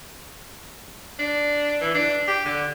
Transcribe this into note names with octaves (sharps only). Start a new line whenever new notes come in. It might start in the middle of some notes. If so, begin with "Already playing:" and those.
D4
E3
D4
G4
D3